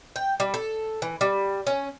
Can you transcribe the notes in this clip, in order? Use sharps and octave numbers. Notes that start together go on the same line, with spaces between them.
G5
G3
A4
E3
G3
C#4